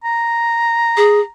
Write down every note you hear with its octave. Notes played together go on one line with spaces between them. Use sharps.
A#5
G#4